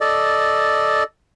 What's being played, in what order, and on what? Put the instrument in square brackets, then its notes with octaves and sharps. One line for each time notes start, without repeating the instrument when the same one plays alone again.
[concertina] A4 D5 D#5